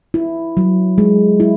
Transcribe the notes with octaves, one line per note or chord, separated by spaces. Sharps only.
E4
F#3
G#3
E4